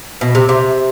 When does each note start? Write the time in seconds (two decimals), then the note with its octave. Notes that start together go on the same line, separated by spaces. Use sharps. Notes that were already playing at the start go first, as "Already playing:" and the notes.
0.21 B2
0.35 C3
0.49 C3